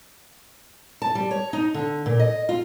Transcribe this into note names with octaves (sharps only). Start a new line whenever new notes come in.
A5
G3
C#5
D#4
D3
A#2
D#5
F4